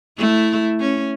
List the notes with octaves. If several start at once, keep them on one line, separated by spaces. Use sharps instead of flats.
A3 E4
C#4